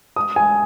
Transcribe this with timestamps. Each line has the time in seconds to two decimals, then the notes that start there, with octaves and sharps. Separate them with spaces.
0.16 D#6
0.36 G#5